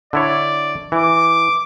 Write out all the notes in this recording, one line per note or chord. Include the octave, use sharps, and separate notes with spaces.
D3 E4 C#5 D5
E3 D6